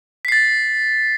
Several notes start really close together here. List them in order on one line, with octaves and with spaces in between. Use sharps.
B6 C7 A6